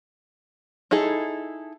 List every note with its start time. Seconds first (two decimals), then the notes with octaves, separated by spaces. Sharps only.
0.91 D#4 E4 G#4 A4